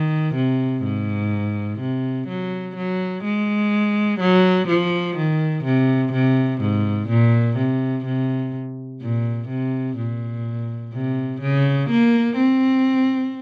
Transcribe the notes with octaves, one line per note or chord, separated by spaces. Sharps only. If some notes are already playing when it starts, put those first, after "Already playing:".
Already playing: D#3
C3
G#2
C3
F#3
F#3
G#3
F#3
F3
D#3
C3
C3
G#2
A#2
C3
C3
A#2
C3
A#2
C3
C#3
A#3
C4